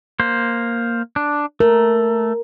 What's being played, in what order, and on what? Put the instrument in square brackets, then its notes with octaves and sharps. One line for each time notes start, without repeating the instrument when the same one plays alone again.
[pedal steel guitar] A#3 C5
D4
[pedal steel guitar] A3 [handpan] A#4